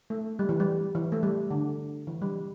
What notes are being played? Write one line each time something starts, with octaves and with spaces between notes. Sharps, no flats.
A3
G3
E3
G3
E3
A3
G3
D3
E3
G3